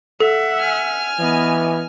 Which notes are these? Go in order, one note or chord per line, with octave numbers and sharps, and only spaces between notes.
A4 E5 F#5
G#5 F6
E3 B3 D#5